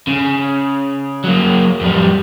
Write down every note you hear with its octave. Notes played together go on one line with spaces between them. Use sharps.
C#3
F#3 A#3
F2 G3